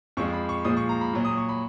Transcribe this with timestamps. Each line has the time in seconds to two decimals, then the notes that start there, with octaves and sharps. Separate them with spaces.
0.17 F2 F3 G#3 C#6
0.33 B5
0.49 C#6
0.64 A#2 F3 G#3 D#6
0.77 C#6
0.89 A#5
1.01 B5
1.13 A#2 F#3
1.25 D#6
1.37 C#6
1.49 B5